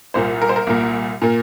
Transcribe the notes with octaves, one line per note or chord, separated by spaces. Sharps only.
C2 A#2 A#3 C5
A#4
C5
A#4
C2 A#2 A#3
A#2 A#3